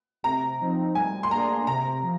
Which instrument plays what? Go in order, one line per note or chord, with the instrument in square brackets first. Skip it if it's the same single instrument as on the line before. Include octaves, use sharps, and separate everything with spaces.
[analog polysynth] C3 [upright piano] A#5
[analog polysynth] F3 C4 D#4
[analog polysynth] G3 [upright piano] G#5
[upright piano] C6
[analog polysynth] A#3 D4 G#4 [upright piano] A#5
[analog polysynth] C3 [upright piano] A#5
[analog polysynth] F3